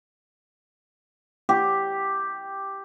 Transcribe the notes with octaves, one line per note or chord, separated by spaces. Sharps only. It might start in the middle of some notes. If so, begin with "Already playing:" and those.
G4